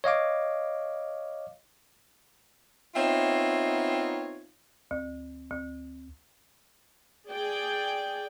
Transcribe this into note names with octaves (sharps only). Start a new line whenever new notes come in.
C#5 D#5 F5 D6
B3 C4 D#4 F4 C#5 E5
D2
D2
G#4 D5 G5